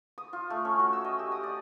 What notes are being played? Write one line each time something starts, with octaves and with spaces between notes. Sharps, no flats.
D#6
F4
A3
C#4
F#4
E6
D#5
G4
D#6
D5